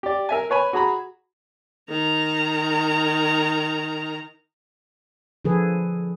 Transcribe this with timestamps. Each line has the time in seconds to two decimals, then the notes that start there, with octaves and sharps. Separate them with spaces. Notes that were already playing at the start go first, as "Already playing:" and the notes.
0.03 G4 D5
0.29 A#4 E5 G#5
0.50 B4 C#5 G#5 B5
0.73 F#4 G#4 A#5 B5
1.89 D#3 A#5
5.45 D3 F3 G#4 A4 B4